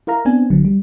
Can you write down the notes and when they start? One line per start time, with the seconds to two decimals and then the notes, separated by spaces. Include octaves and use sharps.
0.07 E4 A#4 F5 A#5
0.25 B3 C4 D4 G#5
0.50 A#1 D3 F#3
0.65 G3